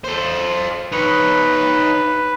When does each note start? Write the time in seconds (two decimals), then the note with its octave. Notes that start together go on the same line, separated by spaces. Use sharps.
0.04 A4 C5
0.92 D#4 B4 C#5